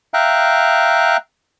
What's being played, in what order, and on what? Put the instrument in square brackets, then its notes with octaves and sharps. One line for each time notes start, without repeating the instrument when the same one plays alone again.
[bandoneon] E5 F5 G5 A#5 F#6